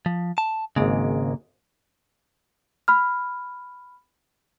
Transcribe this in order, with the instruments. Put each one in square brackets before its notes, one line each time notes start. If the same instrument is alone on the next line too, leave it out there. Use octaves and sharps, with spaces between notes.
[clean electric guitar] F3
A5
[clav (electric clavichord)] G#1 G#3 [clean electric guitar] C#3 A#3
[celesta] B5 F6